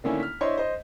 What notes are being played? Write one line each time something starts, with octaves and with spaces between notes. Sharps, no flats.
D3 D#3 A3 A#3 C#4 E4
F6 B6
D4 E4 C5 C#5 D#5 C6
C5 D#5